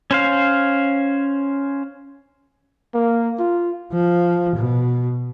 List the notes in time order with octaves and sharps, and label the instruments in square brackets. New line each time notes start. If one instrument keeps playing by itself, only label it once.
[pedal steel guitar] C#4 C5 F5
[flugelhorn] A#3
F4
[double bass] F3
B2